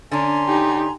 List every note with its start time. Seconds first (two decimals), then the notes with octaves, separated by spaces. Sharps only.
0.11 D3 C#4 D4 G#5 A#5 C6
0.46 D#4 G4